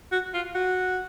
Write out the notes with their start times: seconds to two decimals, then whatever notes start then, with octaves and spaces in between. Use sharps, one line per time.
0.12 F#4
0.34 F4
0.55 F#4